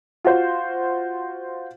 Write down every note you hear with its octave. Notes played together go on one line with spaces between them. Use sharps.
F4 F#4 C5